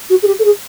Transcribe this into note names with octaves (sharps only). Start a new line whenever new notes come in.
F#4
G#4
G4
A4
G#4